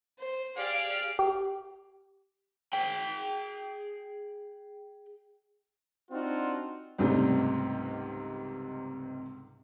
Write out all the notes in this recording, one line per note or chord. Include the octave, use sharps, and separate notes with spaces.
C5
G4 G#4 D5 F5
G4
G#4 G5
C4 D4 D#4 F4 F#4
C#2 G#2 C3 G3 A3 C4